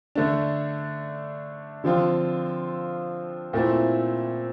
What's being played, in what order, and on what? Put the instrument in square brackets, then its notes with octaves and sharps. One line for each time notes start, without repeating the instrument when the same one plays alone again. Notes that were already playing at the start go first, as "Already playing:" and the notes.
[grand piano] D3 A3 D4
D3 F3 C4 F4
A#2 A3 C4 E4